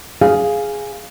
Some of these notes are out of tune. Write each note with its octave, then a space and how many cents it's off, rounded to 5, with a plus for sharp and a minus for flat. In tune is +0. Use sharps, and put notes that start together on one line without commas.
G#4 +0 F5 +0